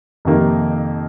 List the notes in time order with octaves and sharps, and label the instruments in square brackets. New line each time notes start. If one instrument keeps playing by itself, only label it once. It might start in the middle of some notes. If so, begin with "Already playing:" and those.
[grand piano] F2 C3 D#3 A#3 D#4